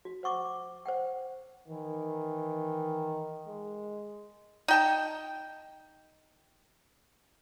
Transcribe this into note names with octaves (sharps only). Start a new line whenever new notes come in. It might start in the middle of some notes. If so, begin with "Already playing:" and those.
F#4
C5 F#5 C#6 D6
C5 F#5 G5
D#3 E3
G#3
D#4 G5 A5